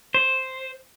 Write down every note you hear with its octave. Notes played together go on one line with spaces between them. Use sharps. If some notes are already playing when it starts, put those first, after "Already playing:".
C5